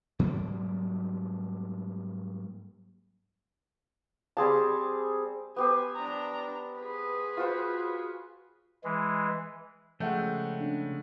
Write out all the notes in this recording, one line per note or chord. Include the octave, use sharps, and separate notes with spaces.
G#2 F#3 G3 A#3
G3 C4 G#4 A5
B3 G4 C5 G#5
D4 A#5
G#4 B4
F4 F#4 C5
E3 G#3
C#3 F3 G#3 A3 E5 F#5 G5
C#4 D4